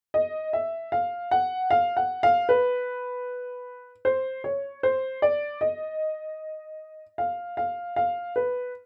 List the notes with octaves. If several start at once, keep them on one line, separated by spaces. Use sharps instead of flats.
D#5
E5
F5
F#5
F5
F#5
F5
B4
C5
C#5
C5
D5
D#5
F5
F5
F5
B4